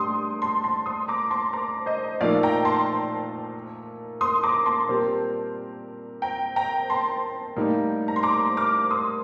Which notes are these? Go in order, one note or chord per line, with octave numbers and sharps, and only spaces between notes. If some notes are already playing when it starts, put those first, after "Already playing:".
Already playing: A2 G3 D4 G4 D5 C6 D#6
A5 C6
A5 C6
C6 D#6
A#5 D6
A5 C6
A#5 D6
C5 D#5
A#2 F3 A3 D#4 A#4 D5 F5
G5 A#5
A5 C6
C6 D#6
A#5 D6
A5 C6
A#2 G3 C4 G4 A#4
G5 A#5
G5 A#5
A5 C6
A2 G3 A#3 D#4 G4
A#5
C6
A#5 D6
D6 F6
C6 D#6